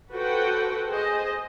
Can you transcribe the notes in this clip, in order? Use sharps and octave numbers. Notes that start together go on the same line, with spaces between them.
F#4 A4 B4 C5 F#5 G5
G#4 C5 D#5